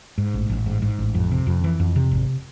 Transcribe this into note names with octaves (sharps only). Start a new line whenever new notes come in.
G#2
A1
A1
G#2
G#2
A1
F2
C3
F2
E3
F2
C3
G#1